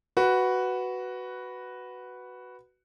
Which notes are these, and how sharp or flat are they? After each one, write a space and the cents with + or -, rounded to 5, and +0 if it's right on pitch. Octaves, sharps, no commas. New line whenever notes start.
F#4 +5 B4 +0